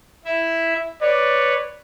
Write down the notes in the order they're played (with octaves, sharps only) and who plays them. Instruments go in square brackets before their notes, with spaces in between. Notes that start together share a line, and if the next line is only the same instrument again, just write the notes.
[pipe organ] E4 E5
[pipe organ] B4 C#5 [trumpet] D5